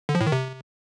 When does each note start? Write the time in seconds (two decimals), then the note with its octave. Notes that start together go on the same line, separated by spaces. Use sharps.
0.09 D3
0.15 F3
0.21 A2
0.26 D#3
0.32 C3